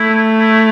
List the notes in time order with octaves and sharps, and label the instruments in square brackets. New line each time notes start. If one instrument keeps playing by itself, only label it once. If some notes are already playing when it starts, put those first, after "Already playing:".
Already playing: [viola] A3 [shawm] E4
[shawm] E4